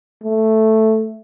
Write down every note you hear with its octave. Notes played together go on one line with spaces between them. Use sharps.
A3